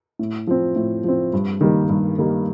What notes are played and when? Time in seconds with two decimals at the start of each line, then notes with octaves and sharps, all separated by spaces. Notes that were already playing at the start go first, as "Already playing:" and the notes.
0.19 A2
0.47 F3 C4
0.76 A2
1.04 F3 C4
1.33 G2
1.61 D#3 G3 A#3
1.89 G2
2.18 D#3 G3 A#3